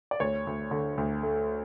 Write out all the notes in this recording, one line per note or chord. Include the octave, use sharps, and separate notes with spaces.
D5
D2 C#5
D2
D3
D2
A3